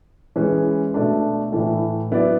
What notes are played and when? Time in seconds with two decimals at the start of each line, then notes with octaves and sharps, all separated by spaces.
0.36 E3 G#3 C#4 G#4 B4
0.94 B2 A3 D4
1.52 A2 E3 A3
2.11 F#3 B3 E4 B4 D5